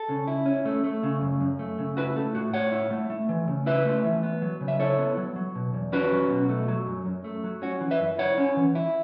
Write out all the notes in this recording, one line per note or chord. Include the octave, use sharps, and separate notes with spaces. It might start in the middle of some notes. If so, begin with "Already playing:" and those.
Already playing: A4
C#3
E4
C#4
A3
A3
C#3
F#2
F#2
A3
C#3
E4 F#4 B4
A3 A4
A2 F#4
A2 C#5 F#5
E4
A3
A3
E3
C#3
E4 B4 E5
A3
E3
B3
F#3
C#3
E5
E4 A4 C#5
B3
F#3
F#3
B2
E2
C#4 F#4 B4
F#3
B2
A3
F#3
F#2
F#2
A3
F#3
C#4 F#4
E3
B4 E5
F#2
E4 C#5 F#5
C#4
E3
E4